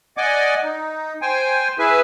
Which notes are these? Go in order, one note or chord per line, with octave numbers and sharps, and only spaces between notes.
D5 D#5 F#5 G#5 D6
D#4
C5 G5 G#5
E4 G#4 B4 E5 G#5